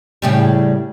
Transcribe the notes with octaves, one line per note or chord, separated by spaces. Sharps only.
A2 C#3 G3